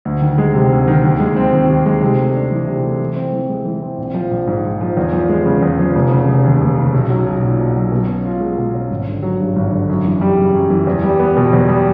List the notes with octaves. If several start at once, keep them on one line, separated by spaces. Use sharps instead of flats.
D2
D#3
G#3
C3
D2
D#3
D#2
G#3
C4
D#3
D#2
G#3
C3
A3
D4
E3
C3
A3
E3
C4
E3
G#3
E3
C4
A#1
F3
A#1
G#2
A#1
F3
E2
F3
G#3
C#3
E2
F3
F1
C#3
F1
D#2
F1
C#3
B1
F#3
B1
A#2
B1
F#3
B2
C#4
F4
G#3
B2
C#4
G#1
D3
F#3
G2
G#1
D3
F#2
E3
G3
C#3
F#2
E3
E2
G3
B3
B2
E2
G3